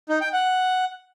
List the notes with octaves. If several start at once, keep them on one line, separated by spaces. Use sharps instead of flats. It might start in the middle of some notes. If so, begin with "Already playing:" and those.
D#4
G5
F#5